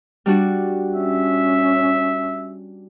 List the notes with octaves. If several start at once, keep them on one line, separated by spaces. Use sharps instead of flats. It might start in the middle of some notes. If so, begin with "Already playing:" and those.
G3 D4 F#4
C#4 E5